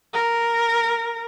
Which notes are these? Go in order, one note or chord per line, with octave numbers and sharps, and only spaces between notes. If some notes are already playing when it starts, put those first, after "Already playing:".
A#4